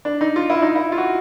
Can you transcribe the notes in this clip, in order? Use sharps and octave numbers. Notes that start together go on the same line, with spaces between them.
D4
D#4
F4
E4
D#4
E4
F4
F#4